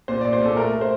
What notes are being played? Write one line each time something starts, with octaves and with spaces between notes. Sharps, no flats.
A#2 C5
D5
A#2
C5
A#2 A4
A3 A#4
A3
C5